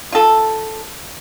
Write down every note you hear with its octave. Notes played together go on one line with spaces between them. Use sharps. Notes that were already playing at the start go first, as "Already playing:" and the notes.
F4 A4